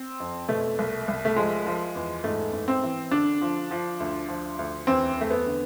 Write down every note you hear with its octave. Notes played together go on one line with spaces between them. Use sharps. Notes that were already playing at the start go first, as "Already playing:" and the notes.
Already playing: C4
F2
B2 A3
C2
C2
A3
F3 G#3
F3
E2
G#2 A3
G#2
C4
E3
D3 D4
F3
F3
D2
F3
D2
E2 C4
E2 A3
B3
D3